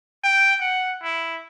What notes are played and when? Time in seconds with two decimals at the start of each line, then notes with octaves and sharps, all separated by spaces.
0.24 G5
0.61 F#5
1.03 E4